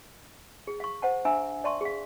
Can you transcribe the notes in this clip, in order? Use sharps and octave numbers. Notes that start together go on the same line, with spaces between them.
G#4
F5 C#6
C5 F#5 A5
D4 E5 G#5 A#5 E6
D5 E5 A5 C6 C#6
G#4 F5